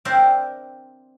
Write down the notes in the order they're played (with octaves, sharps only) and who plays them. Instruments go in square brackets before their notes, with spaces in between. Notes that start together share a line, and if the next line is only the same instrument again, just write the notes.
[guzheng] C4 D4 A#4 C5 E5